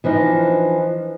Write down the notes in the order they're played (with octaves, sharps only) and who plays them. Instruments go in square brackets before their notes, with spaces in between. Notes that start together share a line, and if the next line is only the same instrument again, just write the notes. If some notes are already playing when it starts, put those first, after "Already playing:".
[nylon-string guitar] E3 F3 D4 D#4